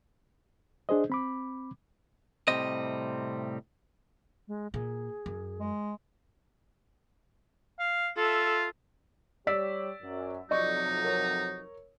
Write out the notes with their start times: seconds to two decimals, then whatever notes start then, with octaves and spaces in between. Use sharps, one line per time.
0.89 D4 G#4 C5 D#5
1.10 C4 B5 D6
2.48 A2 C3 G3 C4 D#5
4.47 G#3
4.74 A#2 G#4
5.26 F#2
5.60 G#3
7.79 F5
8.17 F4 A4 E5
9.47 G3 G4 C#5 D5 E6 B6
10.02 F#2
10.51 F2 C3 F#3 D#4 D5 D#5 C#6
11.04 A#4 C#5